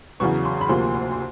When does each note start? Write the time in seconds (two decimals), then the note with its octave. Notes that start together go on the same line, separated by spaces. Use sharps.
0.20 E2 C#3 F#3 B3 C#6
0.45 C6
0.61 B5
0.69 D2 C3 F3 A#3 C6
0.95 C6
1.12 C6